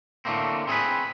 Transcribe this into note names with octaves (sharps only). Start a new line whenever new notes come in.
A2 D3 A3 A#3 C4
C4 G#4 A4 B4